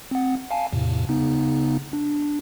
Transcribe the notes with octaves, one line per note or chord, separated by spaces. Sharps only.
C4 F#5
F5 G#5 A5
E2 A2 C3
C#3 B3 D#4
D4